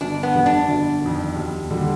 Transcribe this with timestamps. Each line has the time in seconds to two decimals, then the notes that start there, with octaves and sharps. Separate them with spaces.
0.01 G1 D4
0.23 B3
0.34 F2 D3 G3
0.46 D4
0.69 G1
1.02 F2 D#3
1.36 D#2
1.70 D3 G3